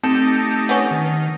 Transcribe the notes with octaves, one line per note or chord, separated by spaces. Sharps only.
A3 C4 D#4 G4 A4
B3 C#4
D#3